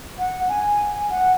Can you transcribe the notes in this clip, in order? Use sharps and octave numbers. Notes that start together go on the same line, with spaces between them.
F#5
G#5
F#5